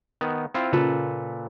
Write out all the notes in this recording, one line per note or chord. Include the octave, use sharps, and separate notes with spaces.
D#3 B3
C4 E4 F4
A#2 C#3 F4 A4 B4